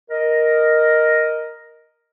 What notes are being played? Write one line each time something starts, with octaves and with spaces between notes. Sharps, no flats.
A#4 D#5